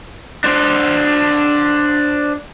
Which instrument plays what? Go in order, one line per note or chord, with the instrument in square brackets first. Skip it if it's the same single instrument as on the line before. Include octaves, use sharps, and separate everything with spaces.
[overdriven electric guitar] D4 C5